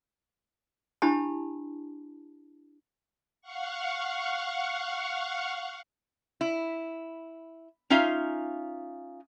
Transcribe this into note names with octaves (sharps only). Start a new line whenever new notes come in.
D4 E4 G4 A5 B5
F5 F#5 C#6
E4
C#4 D#4 F4 E5 F5